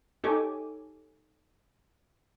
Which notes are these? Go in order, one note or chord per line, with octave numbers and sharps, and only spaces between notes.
D#4 G4 A4 C#5 G#5 D6